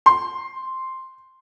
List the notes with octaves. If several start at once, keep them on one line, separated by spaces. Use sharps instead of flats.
C6